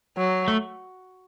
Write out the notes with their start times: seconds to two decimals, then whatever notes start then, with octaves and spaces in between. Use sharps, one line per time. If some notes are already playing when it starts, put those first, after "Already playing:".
0.17 F#3
0.48 A3